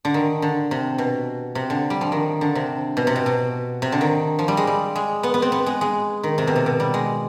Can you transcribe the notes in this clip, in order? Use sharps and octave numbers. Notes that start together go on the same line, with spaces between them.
D3
D#3
D3
C3
B2
C3
D3
G3
F3
D#3
D3
C3
B2
C3
B2
B2
C3
D3
D#3
F3
G3
G#3
G3
G#3
B3
B3
C4
B3
G#3
G#3
D#3
C3
B2
C3
B2
G3
G#3